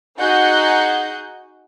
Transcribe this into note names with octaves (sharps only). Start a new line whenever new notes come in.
D#4 F#4 G#4 F#5 G6